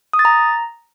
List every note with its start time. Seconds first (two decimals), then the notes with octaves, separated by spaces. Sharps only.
0.13 D#6
0.19 A6
0.25 A#5